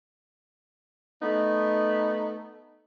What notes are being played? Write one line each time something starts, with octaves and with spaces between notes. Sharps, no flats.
A3 B3 D#4